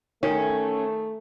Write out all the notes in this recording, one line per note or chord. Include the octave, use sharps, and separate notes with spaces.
D#3 A3 C#4